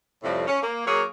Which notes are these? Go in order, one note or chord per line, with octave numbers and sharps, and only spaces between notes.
F2 A2 C3 F3 G3
C#4
A#3
F#3 A#3 G#4 A#4 C#5